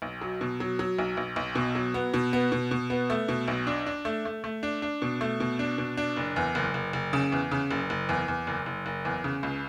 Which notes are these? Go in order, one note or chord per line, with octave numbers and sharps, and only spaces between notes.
B1
F#3
B2
F#3
F#3
B1
B1
B1
B2
F#3
B3
B2
B3
B2
B2
B3
A3
B2
B1
D4
D4
A3
A3
A3
D4
D4
B2
A3
B2
D4
B2
D4
F#1
E2
F#1
F#1
F#1
C#3
E2
C#3
F#1
F#1
E2
E2
F#1
F#1
F#1
E2
C#3
C#2